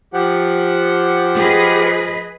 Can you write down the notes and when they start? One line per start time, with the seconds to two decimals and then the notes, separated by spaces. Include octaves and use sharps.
0.14 F3 G4 F#5
1.37 G#4 B4 D#5